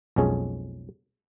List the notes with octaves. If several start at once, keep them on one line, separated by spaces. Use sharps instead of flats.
B1 F2 G#3 C#4 G#4